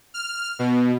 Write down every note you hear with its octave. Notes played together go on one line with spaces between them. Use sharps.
F6
B2